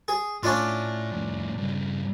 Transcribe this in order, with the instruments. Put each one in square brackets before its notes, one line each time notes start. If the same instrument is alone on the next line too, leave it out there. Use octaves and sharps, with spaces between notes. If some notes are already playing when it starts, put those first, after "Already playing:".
[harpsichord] G#4
[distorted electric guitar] A2 [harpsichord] C#4 D4 F4
[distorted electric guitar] F2 A2
G2 C#3